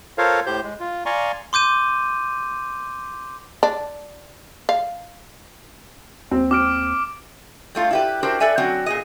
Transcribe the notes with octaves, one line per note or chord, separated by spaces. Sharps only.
F4 A4 A#4 C5 C#5 F5
A2 G4 C5 G6
G#3
F4
D5 F5 G#5 A#5 C6 C#6
C6 D6 G6 D#7
D4
F5
D#2 C4
C4 D6 F6 D7
G3 A3 F4
E4 G4 B4
D4 E4 F#4 G4 A#4 C5
A4 B4 D5 E5 G#5
D3 F#3 C4 C#4 F#4
A#2 G#4 D#5